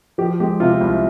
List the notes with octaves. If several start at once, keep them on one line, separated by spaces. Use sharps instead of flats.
F3 G4
G#3 G4
C3 F4
C2